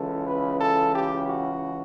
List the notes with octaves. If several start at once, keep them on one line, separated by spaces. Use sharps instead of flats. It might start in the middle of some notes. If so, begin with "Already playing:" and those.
Already playing: C#2 C#3 E3 A4
B4
A4
G4
F#4